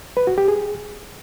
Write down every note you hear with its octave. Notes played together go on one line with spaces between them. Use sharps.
B4
F#4
G4
G#4